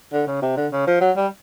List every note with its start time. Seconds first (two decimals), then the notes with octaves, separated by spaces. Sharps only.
0.13 D3
0.27 C#3
0.42 C3
0.57 D3
0.72 C#3
0.87 F3
1.01 F#3
1.17 G3